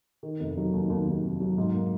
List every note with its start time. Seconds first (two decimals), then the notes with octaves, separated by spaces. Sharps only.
0.23 D#3
0.40 F1
0.57 F#3
0.74 D#2
0.90 D#2
1.06 D#2
1.24 F1
1.40 F#3
1.58 G#2
1.75 A#3